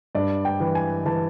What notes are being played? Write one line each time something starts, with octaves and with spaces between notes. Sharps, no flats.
G2 D5
G5
E3
G#5
E3 A5